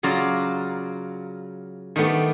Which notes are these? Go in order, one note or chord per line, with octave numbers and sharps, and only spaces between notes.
C#3 F#3 F4 D5 F5 A#5
D#3 G3 A3 B3 D4